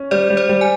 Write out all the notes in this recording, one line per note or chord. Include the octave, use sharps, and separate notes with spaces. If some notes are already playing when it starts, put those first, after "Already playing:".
Already playing: C#4
G3 C5 D5
G3
C5 D5
G3
G#5